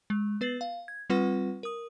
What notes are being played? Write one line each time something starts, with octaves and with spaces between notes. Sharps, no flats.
G#3
B3 B4 A6 C7 F#7
F5
G#6
G3 C4 F4 B4 F#5 C#6
A#4 D#6